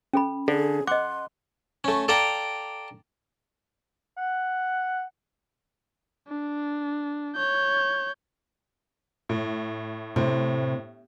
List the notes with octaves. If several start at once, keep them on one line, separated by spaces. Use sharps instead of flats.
C#4 A4 B5
D3 G#4 A4
D#5 F#5 C6 D6
A3 C#4
A4 D5 F5 G5 A#5
F#5
D4
C#5 G6
A2
A2 C3